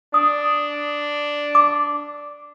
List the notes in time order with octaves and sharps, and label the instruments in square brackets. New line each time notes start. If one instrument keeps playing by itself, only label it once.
[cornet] D4 [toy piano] D#6
[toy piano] D6